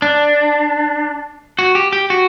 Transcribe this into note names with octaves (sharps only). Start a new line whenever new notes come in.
D4
F#4
G4
G4
F#4